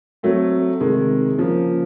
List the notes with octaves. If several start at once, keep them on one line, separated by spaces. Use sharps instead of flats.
F#3 A3 C4
C3 D#3 G#3
C#3 F3 A#3